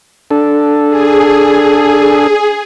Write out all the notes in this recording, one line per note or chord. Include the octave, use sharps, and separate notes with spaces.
D4 A4
G#4